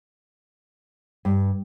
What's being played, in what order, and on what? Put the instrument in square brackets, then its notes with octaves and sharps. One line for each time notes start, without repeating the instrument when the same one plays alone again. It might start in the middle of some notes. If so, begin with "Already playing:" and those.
[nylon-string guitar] G2